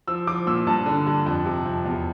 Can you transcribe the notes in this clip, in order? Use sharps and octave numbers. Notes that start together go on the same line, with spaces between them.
F3 E6
F3 D6
A#2 E6
G2 A5
D3
G2
F2
C3
F2
E2